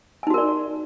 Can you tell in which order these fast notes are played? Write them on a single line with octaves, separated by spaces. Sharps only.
G#5 D#4 F#4 A#4 D5